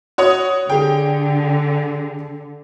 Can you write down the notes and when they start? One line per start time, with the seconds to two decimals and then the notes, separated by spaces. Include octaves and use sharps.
0.18 F#4 C#5 D#6
0.70 D3 G4 G#4 G5